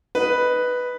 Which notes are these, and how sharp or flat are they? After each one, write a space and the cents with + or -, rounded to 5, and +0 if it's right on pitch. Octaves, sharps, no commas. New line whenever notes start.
D#4 +0 B4 +0